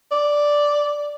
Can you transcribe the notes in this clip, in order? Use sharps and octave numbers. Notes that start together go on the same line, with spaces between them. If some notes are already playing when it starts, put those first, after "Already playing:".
D5